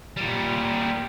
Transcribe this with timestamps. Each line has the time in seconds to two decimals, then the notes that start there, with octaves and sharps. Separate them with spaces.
0.17 A#2 G3